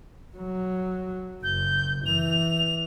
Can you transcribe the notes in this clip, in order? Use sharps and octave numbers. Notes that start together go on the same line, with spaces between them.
F#3
F#1 G6
E3 F7